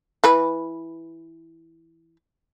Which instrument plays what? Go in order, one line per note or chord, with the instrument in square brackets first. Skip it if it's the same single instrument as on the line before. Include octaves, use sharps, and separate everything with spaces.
[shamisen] E3 B4